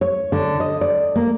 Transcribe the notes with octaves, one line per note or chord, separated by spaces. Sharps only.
C#5
D3
D#5
D5
A#3